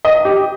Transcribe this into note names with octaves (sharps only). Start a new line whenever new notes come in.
D#5
G4